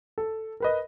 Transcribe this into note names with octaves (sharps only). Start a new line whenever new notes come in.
A4
A#4 B4 D#5